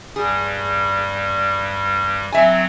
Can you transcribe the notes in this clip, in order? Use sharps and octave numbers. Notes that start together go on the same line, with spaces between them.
G2 G3 G#4
F#3 C4 E5 G#5